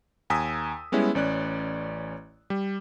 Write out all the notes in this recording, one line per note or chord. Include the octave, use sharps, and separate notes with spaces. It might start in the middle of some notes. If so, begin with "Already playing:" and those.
D#2 G#5 A#5 D#6 E6 B6
G3 G#3 B3 C#4 E4
A1 C#4 D5 F#6
G3